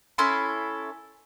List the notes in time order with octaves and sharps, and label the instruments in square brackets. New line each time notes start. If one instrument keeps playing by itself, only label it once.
[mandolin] C#4 E4 A4 C6